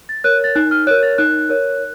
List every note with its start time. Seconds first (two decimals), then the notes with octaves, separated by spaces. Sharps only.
0.09 A6
0.24 A#4 C#5 F#6
0.44 A6
0.55 D#4 F#6
0.71 F6
0.87 A#4 C#5 F#6
1.03 A6
1.18 D#4 F#6
1.49 A#4 C#5